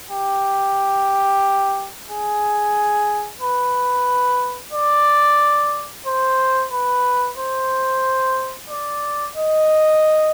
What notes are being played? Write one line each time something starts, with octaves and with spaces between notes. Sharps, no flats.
G4
G#4
B4
D5
C5
B4
C5
D5
D#5